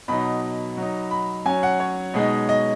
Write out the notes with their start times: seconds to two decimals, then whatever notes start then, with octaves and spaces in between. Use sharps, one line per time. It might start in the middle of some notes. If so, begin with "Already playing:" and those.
0.08 B2 F#3 D#4 B5
0.77 F#3 D#4
1.11 B5
1.45 F#3 C#4 G#5
1.63 F#5
1.80 C#5
2.14 B2 G#3 D#4
2.49 D#5